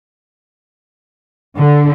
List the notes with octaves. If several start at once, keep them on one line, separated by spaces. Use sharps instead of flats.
D3